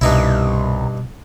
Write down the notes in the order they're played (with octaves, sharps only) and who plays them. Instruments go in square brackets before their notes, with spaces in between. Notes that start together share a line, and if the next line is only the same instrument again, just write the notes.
[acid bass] C2 [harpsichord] G2 D#4 E4 [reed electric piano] B2